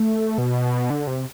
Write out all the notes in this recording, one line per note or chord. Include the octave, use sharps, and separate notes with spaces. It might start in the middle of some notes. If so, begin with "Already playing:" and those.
Already playing: A3
B2
D3
C3